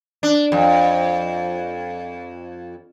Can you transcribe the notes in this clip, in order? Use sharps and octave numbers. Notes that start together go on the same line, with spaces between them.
D4
F2